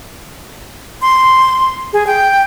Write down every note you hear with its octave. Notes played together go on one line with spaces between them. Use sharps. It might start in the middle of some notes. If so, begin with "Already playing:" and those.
C6
G#4
G5